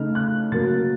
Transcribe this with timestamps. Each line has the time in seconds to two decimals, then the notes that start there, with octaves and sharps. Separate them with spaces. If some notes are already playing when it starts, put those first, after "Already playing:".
Already playing: C#3 A3 D#4 F6
0.15 F#6
0.52 C#3 F#3 A#3 C#4 A6